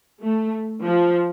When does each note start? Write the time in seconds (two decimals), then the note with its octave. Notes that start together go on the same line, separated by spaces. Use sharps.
0.22 A3
0.85 F3